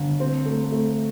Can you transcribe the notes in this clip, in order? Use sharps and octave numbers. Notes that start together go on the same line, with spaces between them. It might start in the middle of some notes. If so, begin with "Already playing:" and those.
Already playing: G1
C4
A3
A3